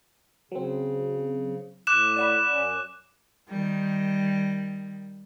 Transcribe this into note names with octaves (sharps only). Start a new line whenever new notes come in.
C#3 F#3 C4
A2 D6 F#6 E7
D5 F#5 B5
F#2 C#4
D#3 G3